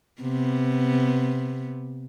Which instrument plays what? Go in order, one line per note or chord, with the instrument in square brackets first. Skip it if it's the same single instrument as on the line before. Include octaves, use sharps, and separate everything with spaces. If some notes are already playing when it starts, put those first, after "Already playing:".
[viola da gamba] C3 B3